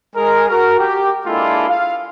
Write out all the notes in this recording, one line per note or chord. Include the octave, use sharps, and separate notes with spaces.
G#3 G#4 A#4
F#4 A#4
G4
G#3 A#3 D4 E4 F4 A4
F5